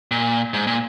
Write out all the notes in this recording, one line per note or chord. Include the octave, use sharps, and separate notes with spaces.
A#2
G#2
A#2